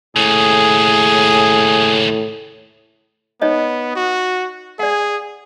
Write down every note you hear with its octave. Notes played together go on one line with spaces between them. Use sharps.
D#2 A2 C#3 G#4
B3 D#4 C#5 D#5
F#4
G#4 D5 F#5